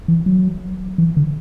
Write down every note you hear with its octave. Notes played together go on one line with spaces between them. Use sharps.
E3
F#3
E3
D3